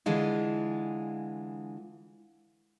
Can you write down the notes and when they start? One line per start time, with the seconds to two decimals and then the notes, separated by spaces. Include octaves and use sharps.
0.06 D3 E3 G#3 F4